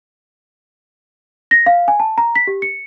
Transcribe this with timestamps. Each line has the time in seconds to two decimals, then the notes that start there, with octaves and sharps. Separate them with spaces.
1.51 A#6
1.66 F5
1.88 G#5
2.00 A5
2.18 A#5
2.35 B6
2.47 G4
2.62 C#7